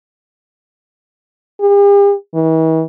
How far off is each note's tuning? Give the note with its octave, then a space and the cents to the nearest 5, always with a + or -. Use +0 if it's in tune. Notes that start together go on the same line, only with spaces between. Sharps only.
G4 +45
E3 -40